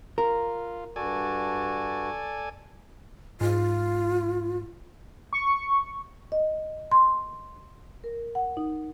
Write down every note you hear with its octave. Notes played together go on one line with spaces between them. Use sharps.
F4 A#4
G2 F#4 A4 D5 G#5
G#2 F4
C#6
D#5
C6
A#4
F#5
D#4